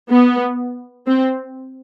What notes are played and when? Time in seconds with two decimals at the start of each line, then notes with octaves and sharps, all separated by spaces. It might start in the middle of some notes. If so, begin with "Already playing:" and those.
0.10 B3
1.07 C4